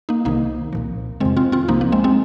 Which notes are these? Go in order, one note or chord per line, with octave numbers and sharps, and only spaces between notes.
A#3 D#4
C2 C3 D#3 A#3 D#4
C2 A#2 F3
F2 C3 D#3 G#3 C4
C4 F4
C4 F4
C2 C3 F3 A#3 D#4
A#3
G#3 C4
G#3 C4